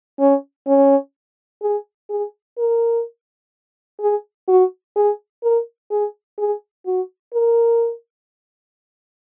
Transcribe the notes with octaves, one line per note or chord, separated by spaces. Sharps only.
C#4
C#4
G#4
G#4
A#4
G#4
F#4
G#4
A#4
G#4
G#4
F#4
A#4